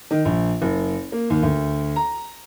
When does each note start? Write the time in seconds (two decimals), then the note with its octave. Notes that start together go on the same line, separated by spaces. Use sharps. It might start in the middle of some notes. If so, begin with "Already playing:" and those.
0.11 D#3
0.25 A#1
0.62 F#1
1.12 A#3
1.30 D#2
1.43 D2
1.96 A#5